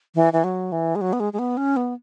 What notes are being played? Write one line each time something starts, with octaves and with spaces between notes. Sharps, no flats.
E3
E3
F#3
E3
G#3
F#3
B3
G#3
G#3
B3
C#4
B3